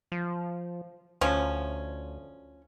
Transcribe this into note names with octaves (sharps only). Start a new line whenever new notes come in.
F3
D2 F3 C#4